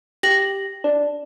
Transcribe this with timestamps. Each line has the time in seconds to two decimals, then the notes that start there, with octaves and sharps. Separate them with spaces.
0.23 G4 A#6 F#7
0.84 D4